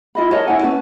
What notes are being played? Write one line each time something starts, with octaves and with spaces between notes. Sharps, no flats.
E4 F4 D#5 B5
A#4 C#5 D#5 A5
E4 C#5 F#5 G#5
C#4 B4 A5